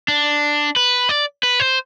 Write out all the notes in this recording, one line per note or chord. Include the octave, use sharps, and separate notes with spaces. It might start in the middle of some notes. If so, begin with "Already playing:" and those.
D4
B4
D5
B4
C5